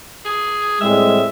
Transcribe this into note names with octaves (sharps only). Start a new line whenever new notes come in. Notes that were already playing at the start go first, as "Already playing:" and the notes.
G#4
A2 G3 G#3 C4 E5